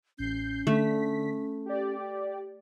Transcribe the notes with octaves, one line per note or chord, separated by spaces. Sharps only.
A1 C#4 G6 C7
D3 A3 B6
G4 D5